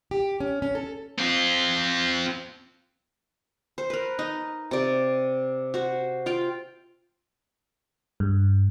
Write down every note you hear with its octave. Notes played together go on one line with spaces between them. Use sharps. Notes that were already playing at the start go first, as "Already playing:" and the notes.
G4
C#4
C#4
A4
C4 F4
C5
A#4 B4
D#4
C3 D5
F#4 C5
F4 F5 G5
G2